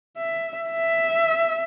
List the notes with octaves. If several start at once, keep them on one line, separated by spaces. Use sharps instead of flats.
E5
E5